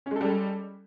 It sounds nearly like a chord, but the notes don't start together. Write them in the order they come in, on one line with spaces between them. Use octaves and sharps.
C#4 G#3 A4 G3